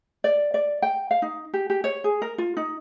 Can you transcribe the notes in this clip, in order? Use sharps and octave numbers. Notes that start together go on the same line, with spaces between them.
D5
D5
G5
F5
D#4
G4
G4
C#5
G#4
A#4
F4
D#4